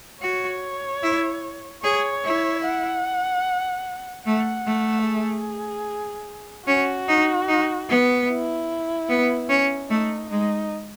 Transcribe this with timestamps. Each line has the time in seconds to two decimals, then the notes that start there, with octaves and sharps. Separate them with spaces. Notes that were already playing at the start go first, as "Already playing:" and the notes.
0.22 F#4 C#5
1.03 E4
1.84 G#4 C#5
2.24 E4
2.65 F#5
4.25 A3 F#5
4.66 A3
5.06 G#4
6.67 C#4 F#4
7.08 D#4
7.48 D#4
7.89 B3
8.29 E4
9.09 B3
9.49 C#4
9.89 A3 D#4
10.31 G#3 D#4